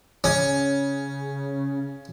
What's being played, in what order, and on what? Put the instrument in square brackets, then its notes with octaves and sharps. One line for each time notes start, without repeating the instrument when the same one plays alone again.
[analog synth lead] C#3 [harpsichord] C#4